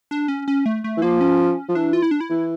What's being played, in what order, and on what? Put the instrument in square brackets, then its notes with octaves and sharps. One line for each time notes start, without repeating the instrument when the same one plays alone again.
[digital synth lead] D4
C#4
C#4
A3
A3
[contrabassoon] E3
[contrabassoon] F3 [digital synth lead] A#3
[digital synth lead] C#4
[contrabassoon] F3
[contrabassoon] E3 [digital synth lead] D4
[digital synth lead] F4
E4
D4
E4
[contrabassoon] E3